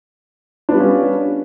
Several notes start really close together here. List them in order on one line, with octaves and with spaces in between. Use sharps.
D4 B3 G3 F4 C#4